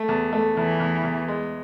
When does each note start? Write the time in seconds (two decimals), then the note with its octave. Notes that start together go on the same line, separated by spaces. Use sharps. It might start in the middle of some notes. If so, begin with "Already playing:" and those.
Already playing: A3
0.08 E2
0.33 A3
0.56 E2 E3
0.80 E2
1.03 E2
1.28 G#3